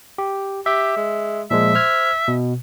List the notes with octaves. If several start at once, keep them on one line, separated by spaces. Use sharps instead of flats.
G4
G4 E5
G#3
A#2 F3 G#3 E5
C5 F6 G#6
B2